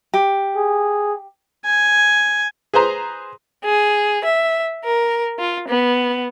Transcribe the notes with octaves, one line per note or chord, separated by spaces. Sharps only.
G4
G#4
G#5
G#4 B4 C5 A#5
G#4
E5
A#4
F4
B3